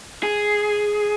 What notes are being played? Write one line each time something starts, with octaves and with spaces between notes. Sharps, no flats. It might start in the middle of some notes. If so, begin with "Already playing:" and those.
G#4